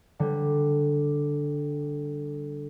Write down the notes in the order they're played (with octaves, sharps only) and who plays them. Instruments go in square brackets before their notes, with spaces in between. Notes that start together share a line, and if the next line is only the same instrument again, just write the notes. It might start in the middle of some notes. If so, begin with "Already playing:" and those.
[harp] D3 G3